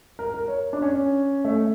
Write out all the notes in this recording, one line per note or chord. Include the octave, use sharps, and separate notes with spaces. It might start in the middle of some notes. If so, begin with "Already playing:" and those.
A#4
A#4
C#5
D4
C#4
A3